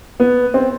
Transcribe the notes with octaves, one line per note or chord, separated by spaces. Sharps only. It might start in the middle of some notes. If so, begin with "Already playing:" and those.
B3
C4